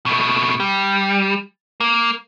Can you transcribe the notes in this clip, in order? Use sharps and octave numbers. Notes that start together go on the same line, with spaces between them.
B2 A3
G3
A#3